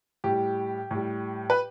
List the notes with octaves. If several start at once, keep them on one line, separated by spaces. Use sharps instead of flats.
A2 G3 G4
A2 G3
B4